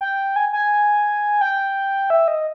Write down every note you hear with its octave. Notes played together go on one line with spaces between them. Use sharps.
G5
G#5
G#5
G5
E5
D#5